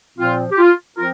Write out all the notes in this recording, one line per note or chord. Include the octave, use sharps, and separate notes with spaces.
A#2 F3 C4 F4
G4
F4
F3 C4 F4 A#4